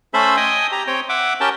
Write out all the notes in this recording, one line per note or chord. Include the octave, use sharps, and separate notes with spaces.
A3 C#4 A4 C5 E5 B5
D#5 G5 G#5 D#6
G4 A#5
C4 C#5 G5
E5 F#5 D6
C#4 G4 A#4 G5 A5